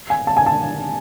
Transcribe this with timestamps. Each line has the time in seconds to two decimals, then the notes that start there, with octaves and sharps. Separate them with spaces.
0.10 G#5
0.27 A5
0.37 G#5
0.46 A5